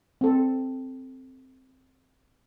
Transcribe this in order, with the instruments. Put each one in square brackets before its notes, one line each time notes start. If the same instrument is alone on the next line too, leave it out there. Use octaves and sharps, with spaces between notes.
[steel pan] C4 A4